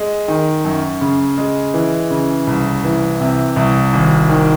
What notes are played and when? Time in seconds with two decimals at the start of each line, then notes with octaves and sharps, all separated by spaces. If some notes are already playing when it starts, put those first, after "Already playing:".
Already playing: G#3
0.28 D#3
0.65 F#2
1.01 C#3
1.38 G#3
1.74 E3
2.10 C#3
2.47 C2
2.84 E3
3.20 C3
3.56 C2
3.93 G#1
4.29 D#3